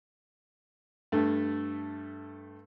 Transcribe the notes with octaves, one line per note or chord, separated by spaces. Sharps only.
G2 A3